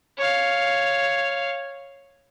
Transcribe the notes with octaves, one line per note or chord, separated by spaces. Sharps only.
C#5 F5